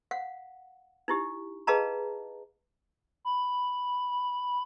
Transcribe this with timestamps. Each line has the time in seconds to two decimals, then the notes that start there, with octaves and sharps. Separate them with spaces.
0.11 F5 F#5
1.08 D#4 E4 G4
1.67 G#4 B4 D#5 F5 A5 A#5
3.25 B5